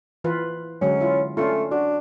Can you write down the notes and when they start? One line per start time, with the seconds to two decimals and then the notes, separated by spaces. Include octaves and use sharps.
0.24 E3 F4 B4
0.81 D3 F#3 G#3 C#4
1.01 E4 F4
1.37 A3 C#4 D4 F4
1.71 D4 F#4